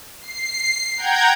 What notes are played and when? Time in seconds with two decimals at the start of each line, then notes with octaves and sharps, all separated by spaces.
0.21 C7
0.97 F#5 G5 A#5 G6 G#6